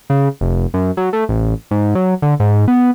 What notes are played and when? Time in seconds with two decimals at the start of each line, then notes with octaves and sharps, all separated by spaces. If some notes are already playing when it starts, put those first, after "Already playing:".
0.10 C#3
0.41 F1
0.74 F#2
0.97 F#3
1.13 A3
1.29 A1
1.71 G#2
1.95 F#3
2.22 D3
2.40 G#2
2.68 B3